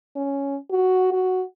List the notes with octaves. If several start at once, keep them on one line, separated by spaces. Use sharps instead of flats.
C#4
F#4
F#4